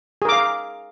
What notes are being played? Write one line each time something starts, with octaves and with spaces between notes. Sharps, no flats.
G#4 A#4 F5 D6